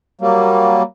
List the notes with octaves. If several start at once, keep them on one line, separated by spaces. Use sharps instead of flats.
F#3 G3 A#3